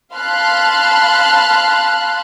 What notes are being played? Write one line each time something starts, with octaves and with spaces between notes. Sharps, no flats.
F5 A5 B5 C6 F6 F#6